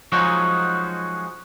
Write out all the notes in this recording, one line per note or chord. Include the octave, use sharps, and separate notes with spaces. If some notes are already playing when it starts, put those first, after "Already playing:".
F3 F#3 G#3 C#4 D#4 F#4